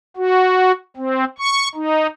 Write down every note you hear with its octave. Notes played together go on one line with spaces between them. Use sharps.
F#4
C4
C#6
D#4